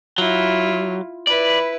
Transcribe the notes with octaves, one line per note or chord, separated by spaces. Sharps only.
F#3 E4 F4
E4 B4 D5